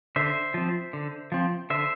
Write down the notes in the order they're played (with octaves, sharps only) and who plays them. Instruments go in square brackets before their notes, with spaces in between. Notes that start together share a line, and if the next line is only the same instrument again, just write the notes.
[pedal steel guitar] D3 C5 E5
F3 C4
D3
F3 C4
D3 C5 E5